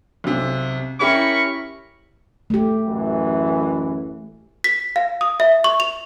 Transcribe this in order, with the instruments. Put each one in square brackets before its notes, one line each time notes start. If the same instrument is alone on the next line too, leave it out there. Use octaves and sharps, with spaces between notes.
[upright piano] B1 C3
[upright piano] C#4 E4 G4 [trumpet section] A#4 B5 C#6
[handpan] A3 G4
[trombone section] A1 F#2 E3
[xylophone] B6
F5
D#6
E5
C#6
F7